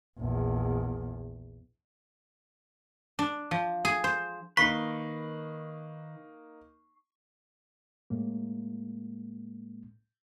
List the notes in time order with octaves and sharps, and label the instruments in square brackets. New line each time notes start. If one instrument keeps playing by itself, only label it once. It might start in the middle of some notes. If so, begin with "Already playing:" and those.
[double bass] A#1 E2
[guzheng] D4
F3
G#4
C5
[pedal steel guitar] D#3 B4 [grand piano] A#3 D#4 [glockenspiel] C#6 C7 [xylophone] B6
[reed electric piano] A2 G#3 A#3